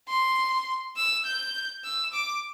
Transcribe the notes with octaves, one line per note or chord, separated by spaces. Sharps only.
C6
E6
G6
E6
D6